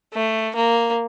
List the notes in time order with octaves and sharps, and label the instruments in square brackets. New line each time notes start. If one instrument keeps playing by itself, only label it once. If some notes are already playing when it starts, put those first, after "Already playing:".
[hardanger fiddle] A3
A#3